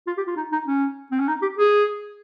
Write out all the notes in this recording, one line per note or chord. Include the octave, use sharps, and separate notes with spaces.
F4
G4
F4
D#4
D#4
C#4
C4
C#4
D#4
G4
G#4